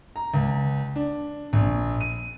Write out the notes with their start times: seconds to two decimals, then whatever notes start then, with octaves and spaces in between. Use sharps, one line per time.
0.16 A#5
0.34 C#2
0.96 D4
1.53 A#1
2.01 D#7